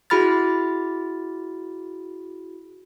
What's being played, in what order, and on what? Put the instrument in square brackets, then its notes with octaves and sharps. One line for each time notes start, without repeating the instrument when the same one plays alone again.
[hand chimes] E4 F#4 G#4 B5 F6 A6